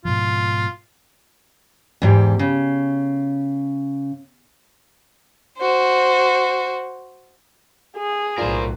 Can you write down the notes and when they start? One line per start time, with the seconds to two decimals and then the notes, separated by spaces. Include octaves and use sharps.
0.05 G#2 B2 F3 F4
2.02 E2 G#2 G4
2.39 C#3
5.58 F#4 C5
7.97 G#4
8.38 B1 A2 F4 A#4 C5 D5